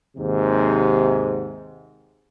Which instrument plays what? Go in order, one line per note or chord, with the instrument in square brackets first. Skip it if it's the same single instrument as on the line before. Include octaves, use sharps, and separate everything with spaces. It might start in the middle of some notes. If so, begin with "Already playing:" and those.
[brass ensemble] D#2 G#2 C3